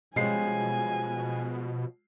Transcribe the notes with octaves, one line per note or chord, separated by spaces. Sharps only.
B2 F3 G3 G#3 C#4 G#5 C7